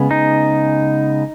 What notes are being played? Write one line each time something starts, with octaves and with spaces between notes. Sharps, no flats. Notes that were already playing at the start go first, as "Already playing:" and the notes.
Already playing: C#3 G#3 B3
D#4